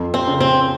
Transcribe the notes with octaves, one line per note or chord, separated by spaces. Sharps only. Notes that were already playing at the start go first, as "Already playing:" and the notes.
Already playing: F2
C4
C#3
C4